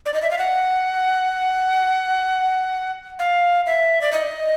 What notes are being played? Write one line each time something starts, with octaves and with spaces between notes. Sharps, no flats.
D5
D#5
E5
F5
F#5
F5
E5
D5
D#5